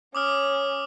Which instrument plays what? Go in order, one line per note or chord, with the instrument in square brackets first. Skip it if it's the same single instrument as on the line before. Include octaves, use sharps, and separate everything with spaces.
[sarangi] C#4 [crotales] D6 D#6 F6